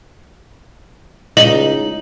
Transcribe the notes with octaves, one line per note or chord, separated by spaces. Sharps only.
C#2 D#4 F#7